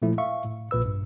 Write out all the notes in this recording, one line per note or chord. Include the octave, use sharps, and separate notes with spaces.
A#2 F3 A3 E4
E5 F5 C#6
A2
A#1 A#2 B4 E6
G2